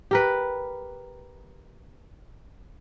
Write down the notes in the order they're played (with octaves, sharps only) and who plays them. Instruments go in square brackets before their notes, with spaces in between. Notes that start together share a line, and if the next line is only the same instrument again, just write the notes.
[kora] G4 A#4 B4